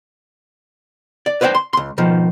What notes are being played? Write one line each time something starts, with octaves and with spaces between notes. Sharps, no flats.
D5
B4 C5 D5 E5 G5
C6
C#2 C6
B2 D#3 F3